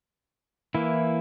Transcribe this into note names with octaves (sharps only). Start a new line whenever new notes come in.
E3 A#3 E4